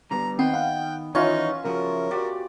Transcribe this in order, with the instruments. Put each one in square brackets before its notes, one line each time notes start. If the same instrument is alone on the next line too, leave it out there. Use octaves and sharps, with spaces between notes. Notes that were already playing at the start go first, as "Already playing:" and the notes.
[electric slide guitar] D3 G3 B3 [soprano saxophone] A#5
[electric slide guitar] D#3 D#5 [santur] B3 [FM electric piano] C4 [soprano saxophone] G5
[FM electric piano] F5 F#5
[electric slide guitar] D#3 E3 [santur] C#4 F4 [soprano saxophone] D#4 [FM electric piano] C#5 E5
[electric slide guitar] C#3 F3 F#4 [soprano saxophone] A#4
[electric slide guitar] F#4 G4 [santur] D5